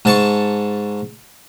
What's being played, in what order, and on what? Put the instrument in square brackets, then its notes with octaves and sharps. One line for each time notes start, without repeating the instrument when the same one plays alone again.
[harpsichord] G#2 A5 C#6